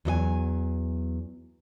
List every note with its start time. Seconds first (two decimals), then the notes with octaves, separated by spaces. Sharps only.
0.05 E2 F#3 D#5 G#5